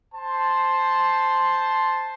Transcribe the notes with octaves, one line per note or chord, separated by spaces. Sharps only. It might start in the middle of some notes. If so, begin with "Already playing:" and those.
C5 A5 C6